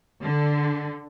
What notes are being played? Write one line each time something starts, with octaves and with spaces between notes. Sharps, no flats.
D3